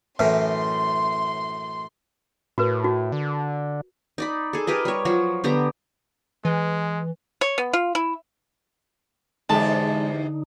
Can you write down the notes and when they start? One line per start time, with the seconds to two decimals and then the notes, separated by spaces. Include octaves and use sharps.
0.19 F#2 A2 E3 C6
2.58 A2 F#4 A#4 B4
2.84 F#4
3.12 D3
4.18 D#4 D5 B5
4.53 G#4 A4
4.67 G4 A#4 B4 D#5
4.85 G3 C#5
5.05 F3 F#3 F#4
5.44 D3 B3 G4 A#5
6.45 E3 G#3
7.41 C#5
7.58 B3
7.73 F4
7.95 E4
9.49 E2 G#2 D3 G#3 D#4 G4 A5